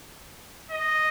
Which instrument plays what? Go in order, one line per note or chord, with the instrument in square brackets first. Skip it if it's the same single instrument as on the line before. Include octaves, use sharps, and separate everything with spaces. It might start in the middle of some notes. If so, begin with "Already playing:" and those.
[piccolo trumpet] D#5